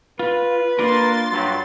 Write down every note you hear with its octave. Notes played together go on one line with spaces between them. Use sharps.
F4 B4
A#3 D4 F4 A#4 C6 A6
G2 F#3